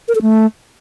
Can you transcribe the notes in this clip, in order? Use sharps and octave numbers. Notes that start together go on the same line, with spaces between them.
A#4
A4
A3